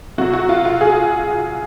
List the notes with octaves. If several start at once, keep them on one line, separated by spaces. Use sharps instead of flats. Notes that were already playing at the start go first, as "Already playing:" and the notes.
C3 F#3 F#4
F#4
F4
F4
G#4